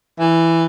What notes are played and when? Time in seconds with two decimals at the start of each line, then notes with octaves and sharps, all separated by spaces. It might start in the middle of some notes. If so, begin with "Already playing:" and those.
0.20 E3